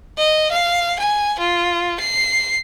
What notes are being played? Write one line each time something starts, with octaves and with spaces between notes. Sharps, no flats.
D#5
F5
G#5
F4
C7